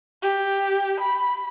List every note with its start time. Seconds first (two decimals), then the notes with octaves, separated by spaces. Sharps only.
0.23 G4
1.01 B5